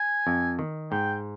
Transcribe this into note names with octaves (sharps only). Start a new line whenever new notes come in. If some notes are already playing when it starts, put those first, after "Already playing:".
Already playing: G#5
F2
D#3
G#2 G5